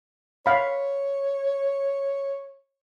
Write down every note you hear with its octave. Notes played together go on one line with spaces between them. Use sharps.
C#5 F5 B5